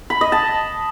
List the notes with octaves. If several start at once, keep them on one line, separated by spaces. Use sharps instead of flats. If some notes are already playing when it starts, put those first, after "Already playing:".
B5
D#5
A5